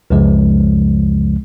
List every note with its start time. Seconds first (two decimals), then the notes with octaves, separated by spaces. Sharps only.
0.10 C#2 F#2 C#3 F3 G#3